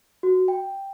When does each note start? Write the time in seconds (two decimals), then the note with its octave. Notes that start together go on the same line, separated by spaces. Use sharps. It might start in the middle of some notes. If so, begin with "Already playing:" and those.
0.23 F#4
0.48 G5